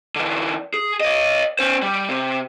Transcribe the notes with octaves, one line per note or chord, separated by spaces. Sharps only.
D3 E3
G#4
C#5 D#5
C#4 C5
G3
C3